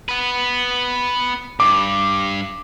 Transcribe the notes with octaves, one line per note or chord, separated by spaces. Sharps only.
B3 B4
G2 D6